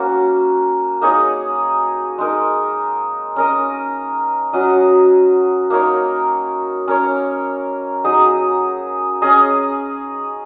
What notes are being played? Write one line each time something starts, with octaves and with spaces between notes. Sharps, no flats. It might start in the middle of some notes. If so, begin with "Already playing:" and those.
Already playing: A#3 C#4 F#4
A#3 D#4 G#4 C#5
G#3 D#4 A#4
C#4 A#4 D#5
F#3 C#4 F#4 D#5
A#3 D#4 A#4 C#5
C#4 A#4 C#5
F#3 D#4 G#4 D#5
C#4 G#4 D#5